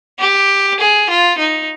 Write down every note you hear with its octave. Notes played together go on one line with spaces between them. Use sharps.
G4
G#4
F4
D#4